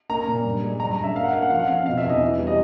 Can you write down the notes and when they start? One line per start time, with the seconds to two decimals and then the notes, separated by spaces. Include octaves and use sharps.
0.09 A#3 A#5
0.27 A#2
0.45 G2
0.63 G#3
0.80 G2 A#5
0.91 A#5
0.98 G2
1.04 E5
1.15 A#3 F5
1.24 F#5
1.33 A#3 F5
1.42 F#5
1.50 F3 F5
1.59 F#5
1.68 C4 F5
1.86 B2 F5
1.97 E5
2.04 E2
2.09 D#5
2.21 E3
2.39 G3
2.47 D#5